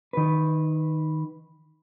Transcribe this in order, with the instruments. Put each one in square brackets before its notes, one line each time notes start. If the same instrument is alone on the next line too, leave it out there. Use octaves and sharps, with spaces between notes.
[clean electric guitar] D#3 B4